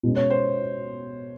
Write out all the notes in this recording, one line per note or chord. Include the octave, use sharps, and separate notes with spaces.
B2 G#3 C#4
C#5
C5